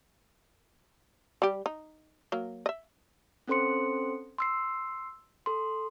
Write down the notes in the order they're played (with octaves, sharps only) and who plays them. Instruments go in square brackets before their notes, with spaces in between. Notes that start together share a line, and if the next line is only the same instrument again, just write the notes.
[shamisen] G3 G4
D#4
F#3 A#3
D#5 E5
[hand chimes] C4 C#4 A4 C5 C6 C#7
C6 E6 C7
A4 C6